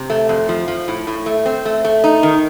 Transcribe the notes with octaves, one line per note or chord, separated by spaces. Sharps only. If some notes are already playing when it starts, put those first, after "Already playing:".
Already playing: C3
A3
F2
F3
F3
A2
A2
A3
C4
A3
A3
D#4
D#3